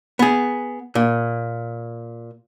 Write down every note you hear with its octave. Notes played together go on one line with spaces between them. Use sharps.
B3 G#4
A#2